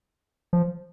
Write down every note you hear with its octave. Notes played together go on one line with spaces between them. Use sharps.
F3